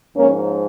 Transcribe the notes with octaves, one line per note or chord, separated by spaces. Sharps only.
G#2 F3 A#3 C#4